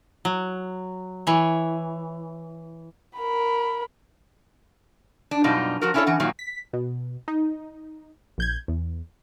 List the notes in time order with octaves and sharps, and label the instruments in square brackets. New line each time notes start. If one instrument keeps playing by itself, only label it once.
[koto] F#3
E3 C#5
[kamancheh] A#4 B5
[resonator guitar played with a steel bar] D4
F#2 B2 G3 D4 D#4 F4
F3 F#4 A#4
C#4 D4 E4 F4 A4 C#5
E3 C#4 F#5
G2 A#2 D#3 F#3
[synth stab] B6
B2
D#4
A#1 G6 G#6
E2